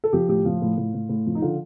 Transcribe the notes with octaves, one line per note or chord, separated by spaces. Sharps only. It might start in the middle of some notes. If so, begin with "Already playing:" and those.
A4
F3 G4
A2 G4
F3 F4
A2
A2
A2
A2
F3
D#4
D3 F4